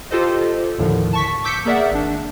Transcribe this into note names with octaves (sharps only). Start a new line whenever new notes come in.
F4 G4 A4 C5 D#5
D#2 A2 D3 D#3 F3
A5 C#6 B6
D6 E6 G6 B6 C#7
A#3 G#4 A#4 D5 E5 F#5
G#1 D4